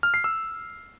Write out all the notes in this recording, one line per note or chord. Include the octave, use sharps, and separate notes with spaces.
F6
C7
E6